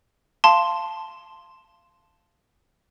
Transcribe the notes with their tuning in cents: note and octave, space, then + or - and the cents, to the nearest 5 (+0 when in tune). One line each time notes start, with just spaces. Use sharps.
F5 -20 A5 +0 C6 +0